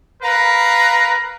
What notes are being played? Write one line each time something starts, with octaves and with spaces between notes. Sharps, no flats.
A#4 B4 F5 A#5